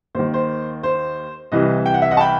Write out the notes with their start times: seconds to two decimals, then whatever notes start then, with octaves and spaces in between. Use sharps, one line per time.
0.15 D#2 D#3 C5
0.34 C5
0.83 C5
1.52 C2 C3 E3 D#5
1.86 G5
1.94 F#5
2.02 E5
2.11 D#5 F#5
2.17 A5
2.20 G5 B5